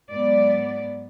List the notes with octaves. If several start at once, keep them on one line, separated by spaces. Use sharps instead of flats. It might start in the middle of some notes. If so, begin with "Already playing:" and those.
G#2 F#3 B3 D5